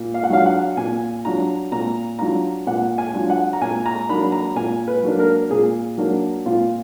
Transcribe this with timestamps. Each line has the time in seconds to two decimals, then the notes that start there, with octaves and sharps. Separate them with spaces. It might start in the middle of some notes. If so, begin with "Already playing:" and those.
Already playing: A#2
0.14 F5
0.23 F#5
0.30 F#3 D4 F4 F5
0.46 F#5
0.77 A#2 G#5
1.25 F#3 D4 F4 A#5
1.72 A#2 A#5
2.19 F#3 D4 F4 A#5
2.67 A#2 F#5
2.98 G#5
3.14 F#3 D4 F4
3.30 F#5
3.53 A#5
3.62 A#2 G#5
3.86 A#5
4.09 F#3 A#3 D4 B5
4.32 A#5
4.55 A#2 G#5
4.87 B4
5.03 F#3 A#3 D4
5.19 A#4
5.50 A#2 G#4
5.98 F#3 A#3 D4
6.45 A#2 F4